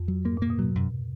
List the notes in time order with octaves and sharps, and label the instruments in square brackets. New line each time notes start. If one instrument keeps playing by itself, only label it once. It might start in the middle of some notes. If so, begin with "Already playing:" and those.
Already playing: [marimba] F2
[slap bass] F#3
[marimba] G#2 [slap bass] A#3
[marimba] A#2 [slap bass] A#3
[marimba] B2
[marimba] C3 [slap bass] F#3
[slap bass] F#2